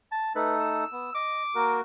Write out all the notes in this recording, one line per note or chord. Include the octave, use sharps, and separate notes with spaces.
A5
A3 D#4 A4 B4
E6
B3
D#5 D6
A#3 F#4 A#4